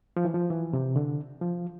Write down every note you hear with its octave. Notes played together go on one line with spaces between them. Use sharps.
F3
E3
F3
E3
C3
D3
F3